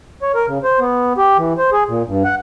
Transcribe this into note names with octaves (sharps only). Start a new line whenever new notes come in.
C#5
A#4
C#3
C5
B3
G4
E3
C5
G#4
A#2
G2
F#5